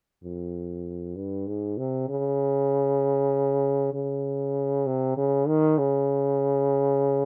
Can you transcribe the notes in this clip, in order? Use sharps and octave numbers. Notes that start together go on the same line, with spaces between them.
F2
G2
G#2
C3
C#3
C#3
C3
C#3
D#3
C#3